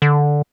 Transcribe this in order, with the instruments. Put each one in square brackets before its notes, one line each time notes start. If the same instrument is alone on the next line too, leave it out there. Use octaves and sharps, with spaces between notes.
[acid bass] D3